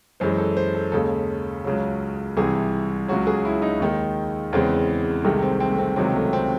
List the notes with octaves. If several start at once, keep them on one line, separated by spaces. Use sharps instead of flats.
F#2 E3 G#3 C5
A4
C5
A4
D#2 C#3 G#3 A4
C#2 C#3 F#3
C2 C3 E3 G#4
C#2 C#3 F#3 F#4
G#4
E4
D#4
D#2 D#3 G#3
E2 C#3 E3 G#3 C4
C2 C3 D#3 G#3 A3
C4
C4
A3
C4
C#2 C3 D#3 F#3 C4
A3
C4